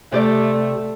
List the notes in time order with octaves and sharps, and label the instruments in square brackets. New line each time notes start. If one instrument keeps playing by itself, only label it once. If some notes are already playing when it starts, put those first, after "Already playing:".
[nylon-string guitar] C3 G4 D5 [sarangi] A3